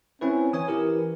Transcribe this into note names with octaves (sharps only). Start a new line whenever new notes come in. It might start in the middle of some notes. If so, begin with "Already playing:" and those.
C4 C#4 E4 B4
E3 C#5 G#5 D#6
E4 G4 A#4